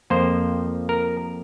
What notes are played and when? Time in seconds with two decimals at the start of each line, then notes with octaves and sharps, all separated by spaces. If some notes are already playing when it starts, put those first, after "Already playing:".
0.10 F2 F3 A#3 C5
0.89 A#4